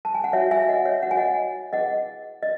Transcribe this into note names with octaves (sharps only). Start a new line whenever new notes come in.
A5
G#5
F#5
D#4 F#4 C#5 E5
E5 G#5
D#5 F#5
C#5 E5
D#4 F#4 C#5 F#5
G#5
D#5 F#5
E4 G#4 B4 D#5 F#5
D#5